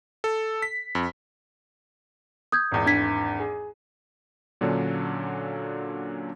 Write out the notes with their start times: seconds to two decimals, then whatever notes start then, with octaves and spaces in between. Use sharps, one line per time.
0.24 A4
0.62 B6
0.95 F2
2.52 D#6 G6 G#6
2.72 G#1 E2
2.86 D4 G#6 B6
3.39 G#4
4.61 A#2 D3 F#3 A#3 C#4 D4